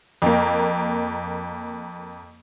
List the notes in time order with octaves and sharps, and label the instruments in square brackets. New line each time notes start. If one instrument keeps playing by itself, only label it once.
[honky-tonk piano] F2 A#3